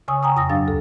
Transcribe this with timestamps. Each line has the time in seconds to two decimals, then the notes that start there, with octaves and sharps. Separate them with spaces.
0.08 C#3 G#5 C#6 D#6 E6
0.23 G5 G#5 A#5 C#6 D#6
0.36 F2 D#6 E6 A#6
0.50 G2 F#3 D4 F5 A6
0.67 D2 A4